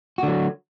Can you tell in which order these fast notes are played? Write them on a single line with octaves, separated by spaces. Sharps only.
F#4 D3 F#3